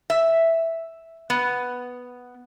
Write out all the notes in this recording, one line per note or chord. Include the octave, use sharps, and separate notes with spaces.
E5
B3